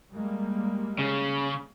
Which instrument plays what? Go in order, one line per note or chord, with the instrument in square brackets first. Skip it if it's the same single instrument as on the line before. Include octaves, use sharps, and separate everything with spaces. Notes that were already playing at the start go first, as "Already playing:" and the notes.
[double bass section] G3 G#3 A#3
[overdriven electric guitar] C#3